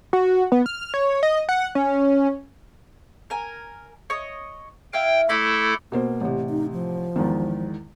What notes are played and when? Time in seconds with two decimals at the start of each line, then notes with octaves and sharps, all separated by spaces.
0.13 F#4
0.52 B3
0.66 F6
0.94 C#5
1.23 D#5
1.49 F#5
1.75 C#4
3.30 A#4 G#5
4.10 C#5 D#5
4.93 E4 F5 G5
5.29 A3 E4 A4 D5 B5
5.92 B2 A#3 B3 C5
6.21 A1 C3
6.50 D#4
6.73 F3
7.16 E2 G#2 D#3